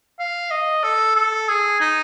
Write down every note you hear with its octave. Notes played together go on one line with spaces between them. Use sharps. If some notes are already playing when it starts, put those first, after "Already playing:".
F5
D#5
A4
A4
G#4
D#4